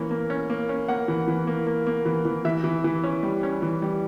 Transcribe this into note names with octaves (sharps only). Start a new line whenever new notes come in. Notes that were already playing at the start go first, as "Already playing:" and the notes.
Already playing: E3 A#3 C#4
A#3
C#4
A#3
C#4
A#3 F#5
E3
E3
A#3
A#3
A#3
E3
E3
E3 E5
E3
E3
C#4
G3
C#4
E3
G3